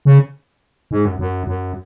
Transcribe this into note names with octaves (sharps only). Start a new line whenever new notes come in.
C#3
G#2
F#2
F#2
F#2